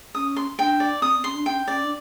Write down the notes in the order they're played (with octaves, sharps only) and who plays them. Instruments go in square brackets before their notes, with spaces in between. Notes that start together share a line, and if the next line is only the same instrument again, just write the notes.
[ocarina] C#4 [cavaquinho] D#6
[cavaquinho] C6
[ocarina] D4 [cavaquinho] G5
[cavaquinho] D5
[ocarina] C4 [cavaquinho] D#6
[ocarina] C#4 [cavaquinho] C6
[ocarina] D4
[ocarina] C#4 [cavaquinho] G5
[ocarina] C#4 [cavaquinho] D5
[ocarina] D4